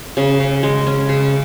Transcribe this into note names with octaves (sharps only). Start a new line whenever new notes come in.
C#3
C#3
G#3
C#4
C#3